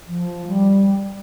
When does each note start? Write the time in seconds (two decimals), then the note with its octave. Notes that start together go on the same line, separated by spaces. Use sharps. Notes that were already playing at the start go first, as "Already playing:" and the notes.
0.07 F3
0.47 G3